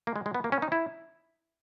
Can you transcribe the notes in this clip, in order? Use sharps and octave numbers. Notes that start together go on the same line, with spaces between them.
A#3
G#3
G#3
B3
A#3
C#4
D#4
E4